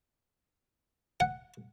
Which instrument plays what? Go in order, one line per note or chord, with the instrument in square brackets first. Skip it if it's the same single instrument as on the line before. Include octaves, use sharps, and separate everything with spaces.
[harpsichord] F#5